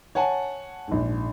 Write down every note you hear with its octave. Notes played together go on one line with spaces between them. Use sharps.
C#5 F#5 G#5 A5
A#1 G#2